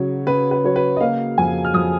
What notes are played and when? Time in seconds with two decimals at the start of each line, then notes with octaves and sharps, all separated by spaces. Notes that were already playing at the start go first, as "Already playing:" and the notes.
Already playing: C#3 F#3 C#5
0.27 C#3 B4
0.51 B4
0.64 F#3 C#5
0.76 B4
0.96 D#5
1.01 A#3 F5
1.38 F2 G#5
1.64 F6
1.74 F2 D#6